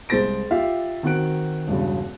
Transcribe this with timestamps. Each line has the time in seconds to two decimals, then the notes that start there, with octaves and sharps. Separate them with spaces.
0.09 C2 G#3 C5 A6 A#6 D7
0.51 F4 G4 E5 F5
1.03 D#3 C4 F#4 F#5 F#6 D7
1.67 E1 G2 C#3